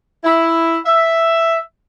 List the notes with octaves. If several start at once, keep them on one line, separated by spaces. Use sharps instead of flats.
E4
E5